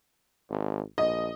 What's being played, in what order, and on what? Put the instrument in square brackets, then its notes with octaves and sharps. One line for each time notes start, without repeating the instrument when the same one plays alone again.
[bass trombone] G#1
[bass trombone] A#1 [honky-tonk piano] D#5